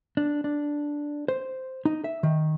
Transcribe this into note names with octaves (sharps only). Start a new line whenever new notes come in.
D4
D4
C5
D#4
E5
D#3